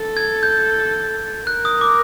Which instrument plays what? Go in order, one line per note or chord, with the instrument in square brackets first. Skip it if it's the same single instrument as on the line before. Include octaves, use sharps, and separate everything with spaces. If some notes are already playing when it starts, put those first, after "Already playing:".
Already playing: [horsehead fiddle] A4
[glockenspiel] G#6
G6
[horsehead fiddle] A#4 [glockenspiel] F#6
[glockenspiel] D#6
D6